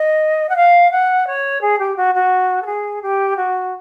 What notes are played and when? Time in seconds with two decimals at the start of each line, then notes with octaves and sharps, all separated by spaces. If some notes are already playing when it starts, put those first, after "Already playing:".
Already playing: D#5
0.49 F#5
0.56 F5
0.91 F#5
1.27 C#5
1.61 G#4
1.79 G4
1.96 F#4
2.15 F#4
2.62 A4
2.66 G#4
3.02 G4
3.36 F#4